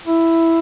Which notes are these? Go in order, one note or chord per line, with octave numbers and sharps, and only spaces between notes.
E4